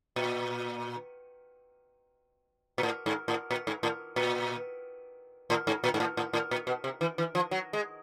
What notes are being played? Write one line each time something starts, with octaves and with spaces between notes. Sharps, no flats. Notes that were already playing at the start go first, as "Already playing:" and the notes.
A#2
A#2
A2
G#2
A2
A#2
G#2
A2
A#2
A2
G#2
A#2
G#2
A2
A2
A2
A#2
B2
C3
E3
E3
F3
F#3
G#3